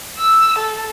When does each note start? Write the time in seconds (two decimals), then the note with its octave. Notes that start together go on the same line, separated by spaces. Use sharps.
0.18 E6
0.59 A4